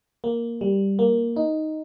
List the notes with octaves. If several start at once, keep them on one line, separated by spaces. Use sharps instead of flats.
A#3
G3
A#3
D#4